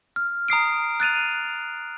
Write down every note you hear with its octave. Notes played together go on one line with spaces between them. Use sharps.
F6
A#5 D#6 C7 D7
F#6 A6 D#7 F7